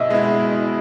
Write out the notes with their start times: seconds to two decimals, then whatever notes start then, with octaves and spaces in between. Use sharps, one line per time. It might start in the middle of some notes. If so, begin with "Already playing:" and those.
Already playing: B2 D#5 E5
0.10 G#3 B3 E4